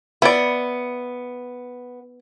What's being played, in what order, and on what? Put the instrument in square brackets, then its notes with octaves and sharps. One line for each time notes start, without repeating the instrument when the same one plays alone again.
[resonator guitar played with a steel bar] B3 [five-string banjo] E4 D5